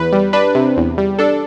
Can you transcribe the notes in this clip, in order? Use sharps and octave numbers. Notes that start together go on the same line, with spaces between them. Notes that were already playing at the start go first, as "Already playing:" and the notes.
Already playing: E2 B4
G3
D4 B4
C3
E2
G3
D4 A4